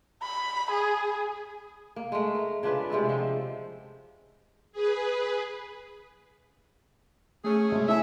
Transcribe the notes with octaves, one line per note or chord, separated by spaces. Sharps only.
B5
G#4
A#3
G#3 A3
A#4
C#3 D4 F4 B4
C3 G#3 A3 A4
F3 C4
G#4 B4
A3 C#4 G#4
G#3
E4 E5 G#5